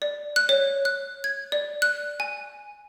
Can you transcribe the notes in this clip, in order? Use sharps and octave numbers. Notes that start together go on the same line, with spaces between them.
D5
F#6
C#5
F#6
G#6
D5
F#6
G#5